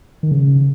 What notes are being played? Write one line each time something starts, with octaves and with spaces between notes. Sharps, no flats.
D#3
C#3